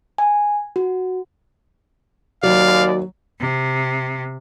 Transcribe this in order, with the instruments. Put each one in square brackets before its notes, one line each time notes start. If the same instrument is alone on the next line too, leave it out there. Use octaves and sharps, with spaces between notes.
[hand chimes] G#5
F#4
[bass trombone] D#2 [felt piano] F#3 [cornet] D5 [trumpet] F5
[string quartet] C3